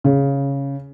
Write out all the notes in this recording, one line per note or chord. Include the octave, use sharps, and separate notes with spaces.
C#3